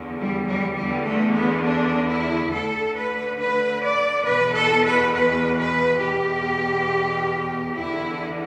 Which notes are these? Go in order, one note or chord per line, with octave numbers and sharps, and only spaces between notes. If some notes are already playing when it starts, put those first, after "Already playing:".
Already playing: E2 D3
G3
G3
E2 D3 G3
A3
B3
D4
E4
D2 D3 A4
B4
B4
D5
E2 B2 B4
A4
B4
B4
B4
E2 B2 G4
E2 D3 E4